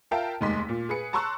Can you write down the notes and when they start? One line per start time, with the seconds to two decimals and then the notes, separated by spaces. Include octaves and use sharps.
0.11 F4 A#4 E5 F5 G5 A5
0.41 F1 D#2 G#3 G#4 C6 B6
0.69 A#2
0.89 G#4 B4 C#7
1.13 A5 A#5 C6 C#6 E6 F#6